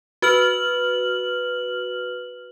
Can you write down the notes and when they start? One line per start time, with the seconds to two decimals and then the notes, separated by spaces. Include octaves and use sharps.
0.22 F#4 B4 F6 F#7